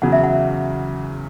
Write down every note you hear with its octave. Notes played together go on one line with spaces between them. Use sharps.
E2 C#3 F#3 F#5
E5
F#5